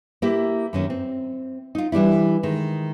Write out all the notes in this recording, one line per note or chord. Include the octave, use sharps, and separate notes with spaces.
A#3 E4 G4 E5
F#2 D#3 C#4
C4
D#4 F4
E3 G3 D4 E4
D#3 G#3